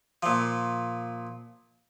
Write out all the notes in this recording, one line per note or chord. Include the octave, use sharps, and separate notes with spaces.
A#2 F3